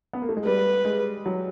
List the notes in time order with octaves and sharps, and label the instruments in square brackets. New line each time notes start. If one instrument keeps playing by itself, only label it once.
[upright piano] B3
A#3
A3
G#3
[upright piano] G3 [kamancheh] B4
[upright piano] G#3
F#3